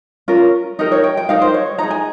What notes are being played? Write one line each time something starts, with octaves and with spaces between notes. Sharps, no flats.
C#4 F4 A#4
D#4 G4 A#4
C#5
G5
G5
D#4 G4 A#4 F5
C5
C#5
D#4 G#4 A#5
G#5